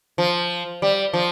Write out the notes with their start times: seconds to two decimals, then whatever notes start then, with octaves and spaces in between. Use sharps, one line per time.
0.18 F3
0.82 G3
1.14 F3